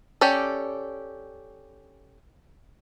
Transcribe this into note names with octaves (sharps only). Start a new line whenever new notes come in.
C#4 G4 A4 D5